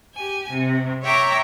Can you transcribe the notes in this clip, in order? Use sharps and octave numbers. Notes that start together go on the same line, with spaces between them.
G4 G#5
C3
C#5 E5 G5 A#5 D6